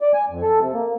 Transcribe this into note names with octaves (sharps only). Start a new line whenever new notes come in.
D5
G#5
F2
A4
C3
A#3